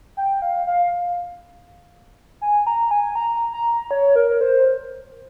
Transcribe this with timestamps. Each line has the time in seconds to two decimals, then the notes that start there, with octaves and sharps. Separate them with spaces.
0.17 G5
0.42 F5
0.67 F5
2.41 G#5
2.67 A#5
2.91 G#5
3.15 A#5
3.53 A#5
3.91 C#5
4.16 A#4
4.41 C5